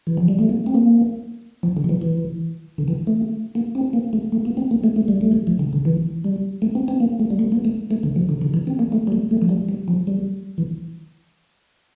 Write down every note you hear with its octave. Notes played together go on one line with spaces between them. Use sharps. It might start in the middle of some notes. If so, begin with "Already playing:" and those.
E3
F3
G3
A3
A#3
C4
A#3
F3
D3
F3
E3
E3
D3
E3
A3
A#3
C4
A#3
A3
A3
A#3
C4
A#3
A3
A3
G3
A3
G3
F3
D3
D3
E3
G3
A3
C4
C4
A#3
A3
G3
A3
A#3
A3
A3
D3
F3
D3
D3
E3
C4
A#3
A3
G3
A3
A3
F3
G3
G3
F3
G3
E3